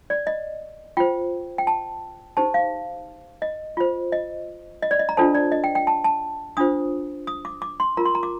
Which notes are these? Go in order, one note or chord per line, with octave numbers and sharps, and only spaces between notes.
D5
D#5
F4 C5 G5
G5
A5
D#4 G4 C5 A5
F5
D#5
F4 C5
D#5
D#5
D5
D#5
A#5
D4 F4 A4 C5 A5
D5
D#5
G5
G5
A5
A5
D4 F4 C5 D#6
D#6
D6
D6
C6
F4 A#4 A#5
C6
A#5
D6